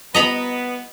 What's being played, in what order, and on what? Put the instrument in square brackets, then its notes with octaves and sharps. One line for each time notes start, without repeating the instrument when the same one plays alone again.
[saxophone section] B3 [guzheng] D#5 A#5 B5